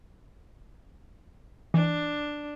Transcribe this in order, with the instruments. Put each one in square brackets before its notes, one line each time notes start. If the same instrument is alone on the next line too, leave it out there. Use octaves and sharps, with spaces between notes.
[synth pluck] E3 [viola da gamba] D4